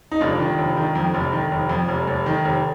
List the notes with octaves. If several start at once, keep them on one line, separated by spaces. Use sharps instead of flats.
D#4
F1 D4 F4
D#3
F1
D#3
F2
F1
D#3
F1
F2
F1
F1
D#3
F1